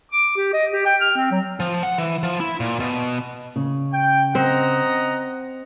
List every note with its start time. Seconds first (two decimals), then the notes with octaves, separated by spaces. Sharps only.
0.12 D6
0.37 G4
0.53 D#5
0.73 G4
0.85 G5
1.01 F6
1.17 C4
1.31 F#3
1.60 F3
1.83 F#5
1.98 E3
2.23 F3
2.40 E4
2.60 A#2
2.80 B2
3.56 C#3
3.92 G5
4.35 C4 D#5 F#5 A#5